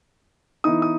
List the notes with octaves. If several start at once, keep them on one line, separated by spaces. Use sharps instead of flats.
E3 B3 D#4 D#6
D#6